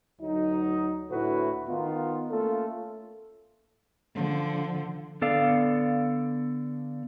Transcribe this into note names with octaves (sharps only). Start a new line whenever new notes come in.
D2 F#3 D#4
D2 A2 A3 E4 F#4 B4
D#3 B3 D#4 F4
A3 A#3 C#4 F4 A4
D3 F3
D3 B3 A4 D5 F5